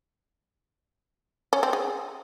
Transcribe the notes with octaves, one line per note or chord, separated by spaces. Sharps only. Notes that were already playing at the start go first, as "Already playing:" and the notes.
C#4
C4
G#4